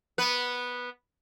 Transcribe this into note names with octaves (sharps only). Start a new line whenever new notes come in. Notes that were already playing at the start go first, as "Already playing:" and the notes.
B3 B4